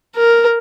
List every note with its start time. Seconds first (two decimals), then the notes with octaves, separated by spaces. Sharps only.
0.16 A#4